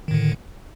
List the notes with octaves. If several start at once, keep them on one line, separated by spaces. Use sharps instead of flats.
A2 D3 D#3